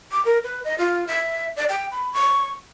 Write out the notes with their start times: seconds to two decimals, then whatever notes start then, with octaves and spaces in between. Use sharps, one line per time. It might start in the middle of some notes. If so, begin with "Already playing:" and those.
0.11 D6
0.25 A#4
0.44 B4
0.64 D#5
0.78 F4
1.07 E5
1.57 D5
1.69 G5
1.91 B5
2.13 C#6